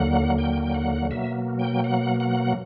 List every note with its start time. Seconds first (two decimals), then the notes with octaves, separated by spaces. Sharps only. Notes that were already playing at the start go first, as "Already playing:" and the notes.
Already playing: D#2 D3 F#3 A#3 F#5
0.38 G5
0.63 G5
0.74 F#5
1.11 B2 F#3 A#3 E5
1.59 G5
1.84 F#5
2.20 F#5